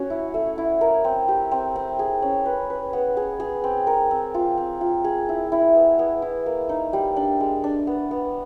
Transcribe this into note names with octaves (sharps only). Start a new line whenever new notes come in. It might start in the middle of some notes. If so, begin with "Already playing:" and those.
Already playing: C#4 F#4
E4
A3
E4
A#4
C4
G4
C4
C4
G#4
C#4
B4
B4
B3
G#4
G#4
C4
A#4
C4
F4
C4
F4
G#4
E4
E4
B3
B3
E4
A#3
D#4
G3
D4
G#3
D4
B3
B3